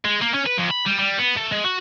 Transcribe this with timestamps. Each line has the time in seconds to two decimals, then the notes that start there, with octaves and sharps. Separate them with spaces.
0.05 G#3
0.22 A#3
0.34 C#4
0.46 B4
0.57 F2
0.70 B5
0.86 G3
0.99 G3
1.19 B3
1.37 A3
1.52 G#3
1.65 F#4